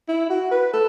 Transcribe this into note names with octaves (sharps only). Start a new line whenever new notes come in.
E4
F#4
B4
A4